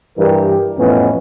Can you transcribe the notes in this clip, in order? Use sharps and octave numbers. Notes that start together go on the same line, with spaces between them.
G2 E3 G4 A#4
F2 A2 E3 B3 C#4